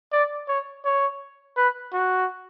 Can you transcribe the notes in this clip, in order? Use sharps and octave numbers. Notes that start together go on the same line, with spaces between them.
D5
C#5
C#5
B4
F#4